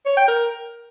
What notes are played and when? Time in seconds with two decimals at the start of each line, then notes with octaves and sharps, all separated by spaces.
0.06 C#5
0.17 G5
0.28 A#4